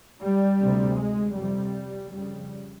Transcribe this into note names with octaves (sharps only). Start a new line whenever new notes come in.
G3
D2 C3
G#3
F2 C3 G3
F2 C#3 G3